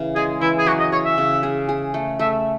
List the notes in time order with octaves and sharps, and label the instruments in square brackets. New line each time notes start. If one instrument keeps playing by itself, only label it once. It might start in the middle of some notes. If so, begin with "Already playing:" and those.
Already playing: [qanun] C#3 E3
[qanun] G#3 [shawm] G#4
[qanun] E3 [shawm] E4
[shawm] G#4
[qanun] F#3 [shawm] F#4
[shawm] D#5
[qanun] G#4 [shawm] C#5
[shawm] E5
[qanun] C#3
G#4
G#4
A3
[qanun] A3 [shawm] E5